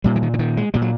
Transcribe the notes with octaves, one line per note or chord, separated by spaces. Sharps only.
A#2 G3
E3
D#3
D3
D#3
G#3
A#2 G3
F#3